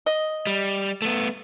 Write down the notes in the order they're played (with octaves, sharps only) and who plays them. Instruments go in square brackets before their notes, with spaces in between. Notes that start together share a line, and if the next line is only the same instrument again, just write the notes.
[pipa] D#5
[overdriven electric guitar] G3
A3 B3